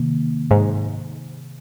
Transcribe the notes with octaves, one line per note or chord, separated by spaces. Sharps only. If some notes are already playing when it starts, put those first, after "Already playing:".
Already playing: C3 D#3 A#3
G#2